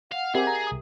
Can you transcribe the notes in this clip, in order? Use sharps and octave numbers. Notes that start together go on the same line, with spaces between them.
F5 F#5
C4 G4 G#4 A#4 E5
A#5
C2 D#6